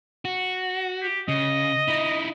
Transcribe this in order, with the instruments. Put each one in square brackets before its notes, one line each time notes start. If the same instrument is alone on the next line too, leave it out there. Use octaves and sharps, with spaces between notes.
[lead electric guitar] F#4
[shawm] G4
[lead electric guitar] C#3 [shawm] D#5
[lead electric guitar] D#4 E4